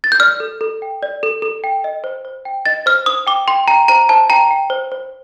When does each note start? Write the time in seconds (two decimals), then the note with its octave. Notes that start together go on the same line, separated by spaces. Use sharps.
0.04 A6
0.12 G6
0.20 D5 F6
0.40 A4
0.61 A4
0.82 G5
1.03 D5
1.23 A4
1.42 A4
1.64 G5
1.84 D#5
2.04 C5
2.25 C5
2.45 G5
2.65 D#5 A6
2.86 C5 F6
3.06 C5 D#6
3.27 G5 D6
3.48 G5 C6
3.68 G5 A#5
3.88 C5 A#5
4.09 C5 A5
4.30 G5 A#5
4.51 G5
4.70 C5
4.92 C5